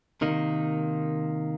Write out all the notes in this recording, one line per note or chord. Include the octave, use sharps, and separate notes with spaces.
C3 D#3 A#3 D#4